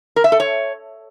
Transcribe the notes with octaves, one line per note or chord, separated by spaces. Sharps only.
A#4
E5
A4
C#5